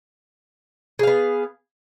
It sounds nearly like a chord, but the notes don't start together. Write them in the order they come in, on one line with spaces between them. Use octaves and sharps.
G#4 F5 B3